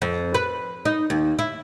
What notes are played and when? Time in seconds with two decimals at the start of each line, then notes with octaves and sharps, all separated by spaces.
0.02 F2
0.34 B4
0.85 D#4
1.10 D#2
1.39 E4